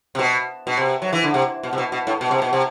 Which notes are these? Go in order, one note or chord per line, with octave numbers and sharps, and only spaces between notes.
C3
B2
B2
C3
F#3
E3
D3
C3
B2
C3
B2
B2
A2
B2
C3
B2
C3